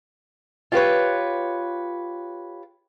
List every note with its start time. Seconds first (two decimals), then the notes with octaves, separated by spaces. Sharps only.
0.72 F4 G4 B4 C#5